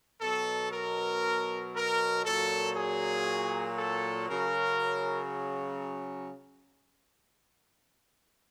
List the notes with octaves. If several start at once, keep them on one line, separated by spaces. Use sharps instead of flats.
B2 F#3 A4
A#4
A#4
A#2 F#3 A4
G#4
A4
C#3 F#3 A#4